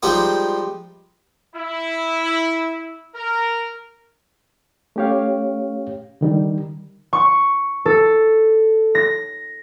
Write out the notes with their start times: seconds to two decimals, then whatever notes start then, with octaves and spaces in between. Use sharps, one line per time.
0.03 F3 G3 G#3 D#4 G4 C5
1.55 E4
3.14 A#4
4.96 A3 C#4 G4 C#5 F5
6.21 D3 D#3 G3
7.13 C#6
7.86 A4
8.95 A#6